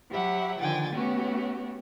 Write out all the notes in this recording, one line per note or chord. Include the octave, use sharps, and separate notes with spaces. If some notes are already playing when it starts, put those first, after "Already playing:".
F#3 G4 E5 F#5 B5
D3 D#3 F3 G5 G#5 A6
A3 B3 C#4 F#4 G4